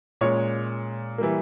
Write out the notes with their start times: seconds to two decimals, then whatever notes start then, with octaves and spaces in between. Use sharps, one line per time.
0.21 A#2 G#3 C#4 C#5
1.18 E3 G3 A#3